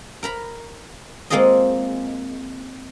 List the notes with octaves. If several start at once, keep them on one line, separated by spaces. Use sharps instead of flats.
A#4 A#5 B5
G#3 A#3 C4 F4 G#4 D#5